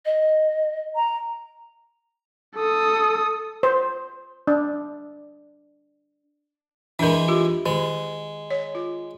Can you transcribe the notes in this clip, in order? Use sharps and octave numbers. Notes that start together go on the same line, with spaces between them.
D#5
A#5
A4 D#6
C5
D4
E3 G#3 D4 A#4
F4 G4
D#3 G#3
C#5
F4